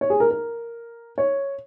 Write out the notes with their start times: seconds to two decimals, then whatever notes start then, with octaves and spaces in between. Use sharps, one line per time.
0.01 C#5
0.10 G#4
0.20 A#4
0.31 A#4
1.18 C#5